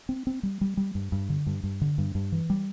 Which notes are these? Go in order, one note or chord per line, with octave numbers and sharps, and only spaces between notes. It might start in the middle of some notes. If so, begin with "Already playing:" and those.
C4
C4
G3
G3
G3
G2
G2
D3
G2
G2
D3
G2
G2
E3
G3